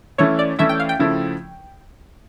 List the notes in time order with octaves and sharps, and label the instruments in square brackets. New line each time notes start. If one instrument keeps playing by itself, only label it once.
[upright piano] E3 A3 C#4 E4 [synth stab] C#5
[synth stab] D5
[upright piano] E3 A3 C#4 E4 [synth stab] E5
[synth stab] G5
F5
G5
[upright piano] C#3 F3 A3 E4